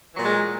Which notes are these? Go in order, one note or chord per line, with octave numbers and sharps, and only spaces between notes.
A#2 E3 F#3 G#3